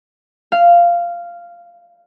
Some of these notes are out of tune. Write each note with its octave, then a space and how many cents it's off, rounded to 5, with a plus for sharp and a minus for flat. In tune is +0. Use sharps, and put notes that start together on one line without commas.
F5 -10